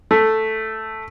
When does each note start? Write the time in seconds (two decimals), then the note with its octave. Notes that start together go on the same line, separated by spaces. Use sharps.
0.11 A3